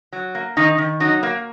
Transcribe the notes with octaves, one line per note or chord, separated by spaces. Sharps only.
F#3
A#3
D#3 D#4
D#3
F#3 D#4
A#3